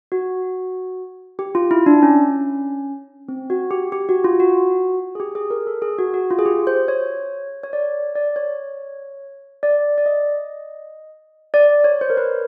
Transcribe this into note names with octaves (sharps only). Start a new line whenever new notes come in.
F#4
G4
F4
E4
D4
C#4
C4
F#4
G4
G4
F#4
F4
F#4
G#4
G4
G#4
A#4
A4
G#4
F#4
F#4
F4
G#4
G4
C5
C#5
C#5
D5
D5
C#5
D5
D5
D#5
D5
C#5
C5
A#4
B4